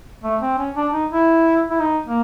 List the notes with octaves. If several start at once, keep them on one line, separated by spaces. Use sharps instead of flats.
A3
C4
C#4
D4
D#4
E4
E4
D#4
A#3